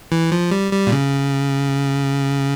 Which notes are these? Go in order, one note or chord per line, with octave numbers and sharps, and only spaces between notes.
E3
F3
G3
G3
A#2
C#3